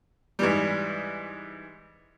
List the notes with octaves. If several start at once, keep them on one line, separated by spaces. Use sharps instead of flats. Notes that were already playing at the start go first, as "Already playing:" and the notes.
G#2 E3 G3